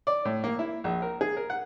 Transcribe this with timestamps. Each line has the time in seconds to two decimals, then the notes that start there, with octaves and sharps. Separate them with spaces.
0.07 D5
0.25 A2
0.44 A#3
0.59 E4
0.84 A#1
1.02 A#4
1.21 G#4
1.37 A#4
1.50 F#5